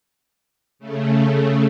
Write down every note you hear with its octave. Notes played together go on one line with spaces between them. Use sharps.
C#3 A3